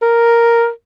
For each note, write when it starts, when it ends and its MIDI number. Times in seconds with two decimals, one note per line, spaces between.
0.02 0.69 70